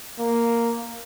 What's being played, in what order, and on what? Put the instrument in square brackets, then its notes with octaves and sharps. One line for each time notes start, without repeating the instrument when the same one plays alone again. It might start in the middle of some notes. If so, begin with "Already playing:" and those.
[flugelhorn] A#3